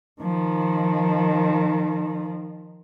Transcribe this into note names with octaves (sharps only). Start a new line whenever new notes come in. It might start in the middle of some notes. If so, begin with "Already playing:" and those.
D#3 F3